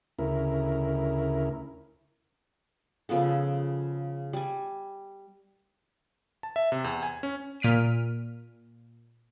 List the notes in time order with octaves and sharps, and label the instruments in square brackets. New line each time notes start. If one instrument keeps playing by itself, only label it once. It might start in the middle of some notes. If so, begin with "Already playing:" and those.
[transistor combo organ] D2 C#3 E4 A#4
[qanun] C#3 F3 B3 A4
G3 G#5
[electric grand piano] A5
E5
C3
E2
G#5
C#4
[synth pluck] A#2 F6 B6 D7 D#7